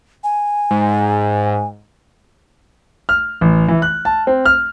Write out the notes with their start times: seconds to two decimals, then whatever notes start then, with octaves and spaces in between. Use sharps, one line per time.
0.24 G#5
0.71 G#2
3.09 F6
3.41 A1
3.68 E3
3.82 F#6
4.05 A5
4.27 C4
4.46 F6